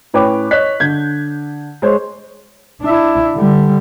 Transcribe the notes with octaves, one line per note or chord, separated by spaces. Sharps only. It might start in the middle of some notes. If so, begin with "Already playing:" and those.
A2 C#4 B4 C#5 G5 D6
C#5 D#5 F#6 B6
D3 G6 G#6
G#3 C5 C#5
D4 E4
D3 G3